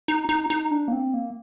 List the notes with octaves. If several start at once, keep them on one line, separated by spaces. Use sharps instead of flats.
D#4
D#4
D#4
D4
A#3
C4
A#3